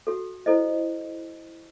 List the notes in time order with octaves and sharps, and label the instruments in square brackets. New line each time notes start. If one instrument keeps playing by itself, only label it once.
[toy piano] F#4 A4
E4 A4 C5 D#5